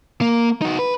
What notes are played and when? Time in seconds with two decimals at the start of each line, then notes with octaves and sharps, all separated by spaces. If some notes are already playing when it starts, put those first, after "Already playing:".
0.21 A#3
0.62 D#4 F#4
0.79 B4